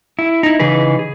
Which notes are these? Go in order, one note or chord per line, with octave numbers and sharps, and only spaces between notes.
E4
D#4 E4
C#3 E3 D#4 G#4 B4
G#4